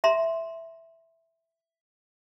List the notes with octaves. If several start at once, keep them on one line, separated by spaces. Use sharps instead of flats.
E5 A#5 C6